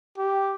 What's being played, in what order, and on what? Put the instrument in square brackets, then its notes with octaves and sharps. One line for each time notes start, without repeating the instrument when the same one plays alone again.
[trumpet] G4